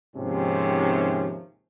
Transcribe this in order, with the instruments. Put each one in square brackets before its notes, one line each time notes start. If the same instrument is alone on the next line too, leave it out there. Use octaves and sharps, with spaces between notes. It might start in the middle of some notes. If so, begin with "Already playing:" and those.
[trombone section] D#2 G#2 C3 F3 C4 C#4